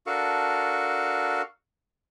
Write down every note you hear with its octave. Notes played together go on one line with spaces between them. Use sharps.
D4 F#4 A4 A#4 F5 C#6